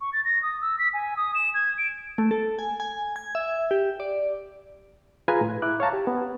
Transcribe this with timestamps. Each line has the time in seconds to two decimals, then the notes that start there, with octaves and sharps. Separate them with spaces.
0.01 C#6
0.13 A6
0.25 A#6
0.43 D#6
0.62 E6
0.79 B6
0.94 G#5
1.17 D#6
1.35 E7
1.54 G#6
1.78 D7
2.18 A3
2.31 A4
2.59 G#5
2.80 G#5
3.16 G#6
3.35 E5
3.71 G4
4.00 D5
5.28 F4 G#4 B4 G#5 A#5
5.41 A2
5.62 E4 D6 F#6
5.80 C#5 F5 A5 A#5
5.93 G4
6.07 B3